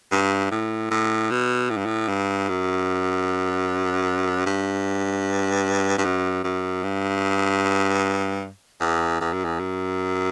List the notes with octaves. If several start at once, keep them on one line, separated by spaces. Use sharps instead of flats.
G2
A2
A2
B2
A2
G2
A2
G2
F#2
G2
G2
F#2
F#2
G2
E2
E2
F#2
E2
F#2